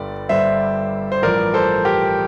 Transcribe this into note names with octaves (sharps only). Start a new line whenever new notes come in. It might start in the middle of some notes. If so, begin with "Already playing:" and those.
Already playing: G1 G2 D3 G3 D5
G1 G2 D3 G3 C5 E5
C5
A1 G2 F3 A#4 D5
A4 C5
G4 A#4